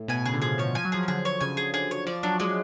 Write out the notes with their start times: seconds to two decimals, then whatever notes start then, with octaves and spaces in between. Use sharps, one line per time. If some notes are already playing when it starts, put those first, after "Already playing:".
Already playing: A2
0.08 B2 G#5
0.25 C#3 G#4
0.33 D3
0.42 F3 G#4
0.58 F3 C#5
0.75 F3 G#5
0.85 F#3
0.92 F3 G#4
1.03 F3
1.08 D3 G#4
1.25 C#5
1.41 C#3 G#5
1.57 G#4
1.74 D3 G#4
1.91 C#5
2.07 F3 D5
2.23 F#3 D4
2.40 G#3 D4